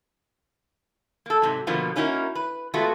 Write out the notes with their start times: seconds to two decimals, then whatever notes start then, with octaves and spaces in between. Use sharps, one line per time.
1.26 A#3 A4
1.42 G#2 C3 F#3
1.67 B2 D3 F3 A#3 B3
1.96 A#3 C#4 D#4 E4 F#4 A#4
2.35 B4
2.74 G#3 A3 B3 F4 F#4